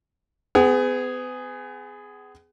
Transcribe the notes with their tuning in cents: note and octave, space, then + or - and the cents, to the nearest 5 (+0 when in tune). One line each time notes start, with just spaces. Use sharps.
B3 +40 G#4 +0 F#5 +45